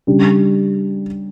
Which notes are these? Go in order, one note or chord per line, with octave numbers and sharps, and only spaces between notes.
C#3 G3 D4 G4